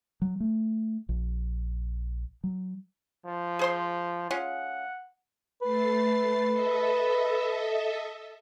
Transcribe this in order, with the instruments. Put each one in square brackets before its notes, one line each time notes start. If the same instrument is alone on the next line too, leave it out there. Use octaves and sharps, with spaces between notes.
[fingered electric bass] F#3
A3
A#1
F#3
[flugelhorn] F3
[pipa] G#4 C5 C6
[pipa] G#3 C#4 F4 [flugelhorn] F#5
[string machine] A3 A6 C7 [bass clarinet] B4
[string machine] A4 D#5 E5